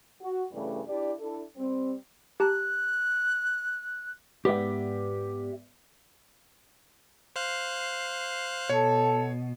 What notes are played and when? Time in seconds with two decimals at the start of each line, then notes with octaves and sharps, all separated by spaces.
0.21 F#4
0.52 G2 C#3 E3 G3 A3
0.87 D4 E4 G4 D5
1.20 D4 E4 A4
1.57 G3 C4
2.40 G4 A5 A#5 F#6
4.45 G#2 B3 G4 D5 E5
7.36 C5 F5 F#6
8.70 B2 A4 C#5